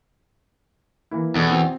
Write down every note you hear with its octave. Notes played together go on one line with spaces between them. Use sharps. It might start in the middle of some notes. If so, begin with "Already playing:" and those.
E3 A#3 E4
E2 B2 E4 A4
C4 F#4